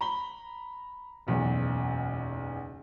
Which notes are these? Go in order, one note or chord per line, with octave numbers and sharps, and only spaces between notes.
A#5 B5 G7
F#1 B1 E2